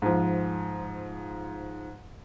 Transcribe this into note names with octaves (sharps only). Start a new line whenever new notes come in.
G#2 F3